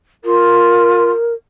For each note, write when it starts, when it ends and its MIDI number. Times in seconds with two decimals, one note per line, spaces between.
0.24 1.10 65
0.24 1.34 70